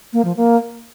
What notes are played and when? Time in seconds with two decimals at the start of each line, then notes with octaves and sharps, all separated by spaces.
0.13 A#3
0.25 F3
0.36 A#3